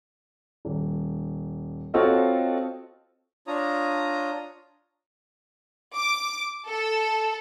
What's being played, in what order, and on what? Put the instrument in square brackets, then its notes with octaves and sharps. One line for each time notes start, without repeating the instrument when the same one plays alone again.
[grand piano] D#1
C4 F4 F#4 A4 C#5 D#5
[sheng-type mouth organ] D4 F4 C#5 A#5 D#6
[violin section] D6
A4